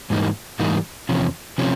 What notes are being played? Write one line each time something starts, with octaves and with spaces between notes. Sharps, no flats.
G#2 E3 G3 A#3 D#4
G#2 E3 G3 A#3 D#4
E2 C3 F3 C#4
C3 F3 C#4